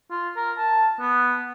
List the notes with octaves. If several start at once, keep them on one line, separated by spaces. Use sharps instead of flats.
F4
A#4
A5
B3